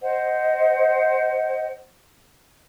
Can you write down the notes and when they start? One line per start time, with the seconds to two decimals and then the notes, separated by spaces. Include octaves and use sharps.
0.03 C5 D#5 F#5